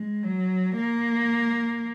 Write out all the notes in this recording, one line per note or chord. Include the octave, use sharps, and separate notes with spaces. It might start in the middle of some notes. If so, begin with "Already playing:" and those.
Already playing: G#3
F#3
A#3